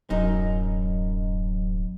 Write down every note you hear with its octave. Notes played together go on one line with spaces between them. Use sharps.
D1 F#2 D#4